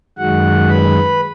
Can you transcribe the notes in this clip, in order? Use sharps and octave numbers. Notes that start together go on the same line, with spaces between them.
F#2 D#3 G#3 F#4 F#5
B4 B5